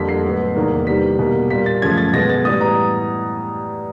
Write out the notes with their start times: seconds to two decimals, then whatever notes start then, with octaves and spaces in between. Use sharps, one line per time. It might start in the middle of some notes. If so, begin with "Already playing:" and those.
Already playing: F2 D3 G3 A#3 B6
0.09 C7
0.24 A2 F#3 B3
0.56 E2 C3 D#3 G3 A#3
0.87 C3 E3 G3 A#3 B6
1.19 B2 G3 A#3
1.50 A#2 G3 A#3 B6
1.66 A6
1.82 F#2 C#3 F3 A3 G#6
1.98 A6
2.13 B2 G#3 B3 A#6
2.29 A6
2.45 A2 E3 G3 B3 D#6
2.61 A#5